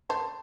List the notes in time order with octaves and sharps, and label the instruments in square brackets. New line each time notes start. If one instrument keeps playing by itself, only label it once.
[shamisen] C5 [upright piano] A5